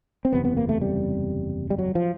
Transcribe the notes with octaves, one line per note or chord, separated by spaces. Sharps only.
C4
F#1 E2 C3 B3
B3
A#3
A3
G3
G3
F#3
F3